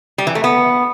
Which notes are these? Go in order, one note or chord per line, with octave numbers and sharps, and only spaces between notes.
G3
E3
A3
B3